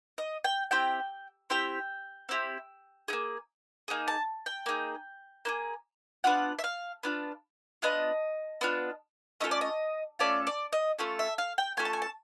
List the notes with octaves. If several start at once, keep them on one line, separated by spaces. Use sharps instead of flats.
D#5
G5
C4 E4 G4 G5
C4 E4 G4 G5
C4 E4 G4
A#3 D#4 G#4
A#3 D#4 G#4
A5
G5
A#3 D#4 G#4
A#3 D#4 G#4
B3 D4 F4 F#5
E5
F5
B3 D4 F4
B3 D4 F4 D#5
B3 D4 F4
A3 C#4 F4 A4 D#5
D5
D#5
A3 C#4 F4 A4 D5
D5
D#5
A3 C#4 F4 A4
E5
F5
G5
A3 C#4 F4 A4 G#5
A5
G#5
A5